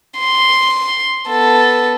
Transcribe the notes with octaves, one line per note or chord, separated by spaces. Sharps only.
C6
B3 A4